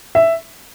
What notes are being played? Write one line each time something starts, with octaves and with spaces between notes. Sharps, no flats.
E5